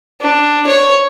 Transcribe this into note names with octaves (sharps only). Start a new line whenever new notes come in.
D4
C#5